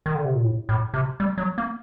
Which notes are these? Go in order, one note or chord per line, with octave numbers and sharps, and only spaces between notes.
D#3
D3
C3
A#2
A2
A2
C3
G3
F#3
A#3